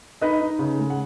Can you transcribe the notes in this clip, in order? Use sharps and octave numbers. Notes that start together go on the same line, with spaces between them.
D#4 B4 D#5
D#4
C#3
G#3
F#5